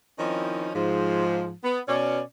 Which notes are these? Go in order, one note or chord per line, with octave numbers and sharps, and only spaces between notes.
D#3 F3 C4 C#4 D#4 E4
G#2 F3
B3
B2 C#4 D5